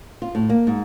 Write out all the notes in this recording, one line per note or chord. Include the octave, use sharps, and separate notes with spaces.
F4
A2
A#3
G#2